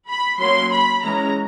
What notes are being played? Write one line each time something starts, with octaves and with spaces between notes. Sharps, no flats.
B5
F#3 A#3 C#4 C6
B5
E3 G#3 C#4 A#5